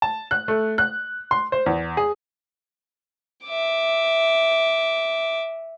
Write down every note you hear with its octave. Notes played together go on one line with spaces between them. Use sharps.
A5
F#6
A3
F#6
C6
C5
E2
G#4
E5 D6